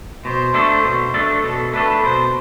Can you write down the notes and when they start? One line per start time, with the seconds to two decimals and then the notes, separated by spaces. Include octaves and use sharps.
0.25 B2 C5
0.54 A3 D4 A4
0.84 B2
1.14 A3 D4 A4
1.44 B2 A4
1.73 A3 D4 A4 B4
2.03 B2 C5